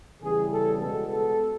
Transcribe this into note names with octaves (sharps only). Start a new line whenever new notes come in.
E2 C#3 E3 G3 G#4
A4
B2 G#3 B3 A4
A4